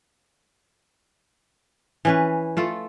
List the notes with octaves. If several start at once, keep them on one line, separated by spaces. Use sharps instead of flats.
E3 C#4 B4
A3 F4 A4